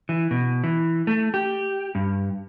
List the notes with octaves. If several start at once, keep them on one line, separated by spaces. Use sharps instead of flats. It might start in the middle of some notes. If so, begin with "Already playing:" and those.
E3
B2
E3
A3
G4
G2